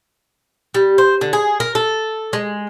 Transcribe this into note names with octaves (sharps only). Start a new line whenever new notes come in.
G3
C5
D3
G#4
A#4
A4
G#3